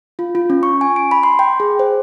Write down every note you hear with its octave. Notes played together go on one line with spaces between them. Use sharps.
F4
F4
C#4
C#6
G#5
D7
B5
C6
G5
G#4
C5